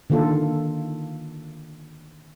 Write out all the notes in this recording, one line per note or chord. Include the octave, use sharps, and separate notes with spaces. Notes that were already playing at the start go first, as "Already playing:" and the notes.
D3 D#3 A#3 F4 A4